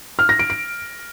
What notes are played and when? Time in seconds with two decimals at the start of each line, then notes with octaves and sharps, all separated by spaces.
0.19 F6
0.29 A#6
0.39 D7
0.50 D7